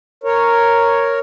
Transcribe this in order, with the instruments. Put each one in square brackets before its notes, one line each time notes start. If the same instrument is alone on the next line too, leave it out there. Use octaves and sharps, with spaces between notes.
[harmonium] A#4 C#5